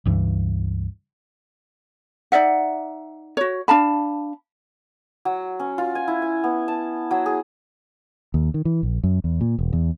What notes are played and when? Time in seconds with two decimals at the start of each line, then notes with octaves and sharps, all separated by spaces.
0.05 C#2 G2 E3
2.32 D#4 D5 E5 F#5
3.37 F#4 C#5
3.68 D4 F5 A5 B5
5.25 F#3
5.60 C#4
5.78 F4
5.95 G#5
6.08 E4
6.22 G#5
6.44 B3
6.68 A5
7.11 F#3
7.26 G#4
8.34 D#2
8.54 D#3
8.65 E3
8.83 A#1
9.04 F#2
9.24 E2
9.41 A#2
9.59 E1
9.73 E2